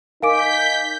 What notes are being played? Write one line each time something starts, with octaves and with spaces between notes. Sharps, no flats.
D#4 A#4 F5 G#5 D6 G6 B6 D7